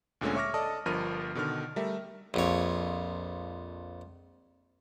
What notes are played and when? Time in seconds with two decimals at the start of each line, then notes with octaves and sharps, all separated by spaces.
0.21 D2 A#2 D3 G#3 C#4
0.35 C#5 E5 C#6 D6 F6 A#6
0.54 A4 D5 D#5 A5 D#6
0.86 G1 G2 F3 A#4 F6 D#7
1.35 B2 D3 D#3 F6
1.76 G3 A3 A#4 E5
2.34 A#1 F2 C#5